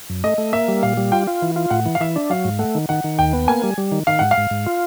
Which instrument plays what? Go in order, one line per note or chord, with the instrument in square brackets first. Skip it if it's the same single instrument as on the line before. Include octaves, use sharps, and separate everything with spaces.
[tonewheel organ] F#2
[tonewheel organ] A3 [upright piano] D#5
[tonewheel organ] A3
[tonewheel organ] A#3 [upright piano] E5
[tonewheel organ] G3
[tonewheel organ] A#2 [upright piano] F5
[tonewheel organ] G3
[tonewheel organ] F4 [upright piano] G5
[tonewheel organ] F4
E3
F4
[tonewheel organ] A2 [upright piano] F#5
[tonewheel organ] E3
[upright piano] F5
[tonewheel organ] E3 [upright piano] E5
[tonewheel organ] D4
[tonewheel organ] F#3 [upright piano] F5
[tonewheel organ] G#2
[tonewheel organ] A3 [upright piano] F#5
[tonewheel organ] D#3
[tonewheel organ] D#3 [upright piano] F#5
[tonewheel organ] D#3
[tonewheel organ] D#2 [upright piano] G5
[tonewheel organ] B3
[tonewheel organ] A#3 [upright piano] G#5
[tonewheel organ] G3
G3
D#3
[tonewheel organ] D#3 [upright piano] F5
[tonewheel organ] G#2 [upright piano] F#5
[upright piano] F5
[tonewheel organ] G#2
G#2
F4